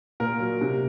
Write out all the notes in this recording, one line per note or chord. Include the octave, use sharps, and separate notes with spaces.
A#2 A#4
F#3
C3